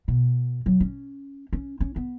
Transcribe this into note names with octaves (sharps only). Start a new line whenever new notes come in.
B2
F#3
C#4
C#4
C#4
B3